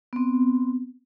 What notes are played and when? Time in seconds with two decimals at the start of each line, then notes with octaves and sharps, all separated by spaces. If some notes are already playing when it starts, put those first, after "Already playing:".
0.13 B3 C4